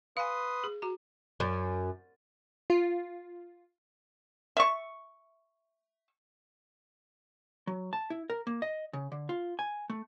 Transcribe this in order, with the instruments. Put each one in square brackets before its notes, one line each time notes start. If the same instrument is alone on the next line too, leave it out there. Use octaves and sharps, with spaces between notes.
[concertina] B4 C6 D#6 [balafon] F5 G#5
[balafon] G#4
F#4 A#5
[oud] F#2
[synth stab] F4
[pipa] E5 C#6
[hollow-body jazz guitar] F#3
A5
E4
A#4
A#3
D#5
C#3
D3
F4
G#5
A3